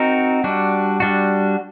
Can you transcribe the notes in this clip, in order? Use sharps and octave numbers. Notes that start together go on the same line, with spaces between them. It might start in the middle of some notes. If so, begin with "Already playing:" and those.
Already playing: C4 D#4 F#4 A#4
G3 D4 F#4
G3 D4 F#4